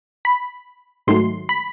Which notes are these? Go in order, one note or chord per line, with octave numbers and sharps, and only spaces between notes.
B5
G#2 D#3 F#3 A3 C6
B5